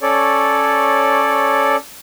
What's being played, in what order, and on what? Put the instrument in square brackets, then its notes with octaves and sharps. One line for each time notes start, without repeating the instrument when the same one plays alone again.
[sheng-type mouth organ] C#4 A4 C#5 D5